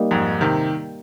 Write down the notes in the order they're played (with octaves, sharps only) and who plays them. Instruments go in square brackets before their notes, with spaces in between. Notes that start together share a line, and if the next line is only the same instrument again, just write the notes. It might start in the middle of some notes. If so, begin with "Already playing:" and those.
Already playing: [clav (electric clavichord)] G3 A#3 D#4
[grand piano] F2 G#2
C3 D#3